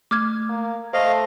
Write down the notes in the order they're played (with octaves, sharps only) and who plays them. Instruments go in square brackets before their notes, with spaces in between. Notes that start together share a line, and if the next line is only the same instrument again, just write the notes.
[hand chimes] A3 [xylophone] D6 F6 G#6
[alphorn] A#3
[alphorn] A3 [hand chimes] C5 [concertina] D#5 F5